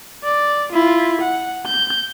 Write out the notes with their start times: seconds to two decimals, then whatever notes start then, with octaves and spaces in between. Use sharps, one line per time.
0.24 D5
0.73 E4 F4
1.21 F#5
1.66 G6